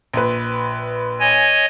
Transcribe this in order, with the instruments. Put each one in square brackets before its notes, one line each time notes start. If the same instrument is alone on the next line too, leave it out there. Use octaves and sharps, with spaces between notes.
[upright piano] A#1 B4
[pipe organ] C#5 D#5 G#5